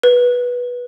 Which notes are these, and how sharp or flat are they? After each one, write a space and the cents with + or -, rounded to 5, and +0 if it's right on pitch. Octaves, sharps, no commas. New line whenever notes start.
B4 -15